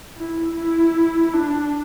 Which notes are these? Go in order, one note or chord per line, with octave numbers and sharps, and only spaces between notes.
E4
E4
D4